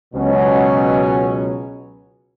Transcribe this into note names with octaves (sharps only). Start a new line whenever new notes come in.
C#2 B2 F#3 C#4